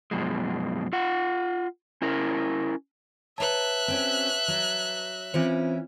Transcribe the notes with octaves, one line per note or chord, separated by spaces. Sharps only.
F#2 B2 F3 G#3
F4 F#5
C#4 E4 A#4
B4 C#5 E5 A5 A#5 F#6
C4 C#4 F#4
F#3
E3 C4 C#4 E4 F4 C5